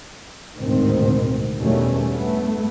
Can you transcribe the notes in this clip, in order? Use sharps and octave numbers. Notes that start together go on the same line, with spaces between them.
A1 D2 G#2 B2 D#3 C4
E2 B2 D#3 G3 A3 C#4
G2 A3 B3